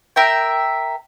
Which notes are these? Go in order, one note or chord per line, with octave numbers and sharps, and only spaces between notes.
A#4 E5 G5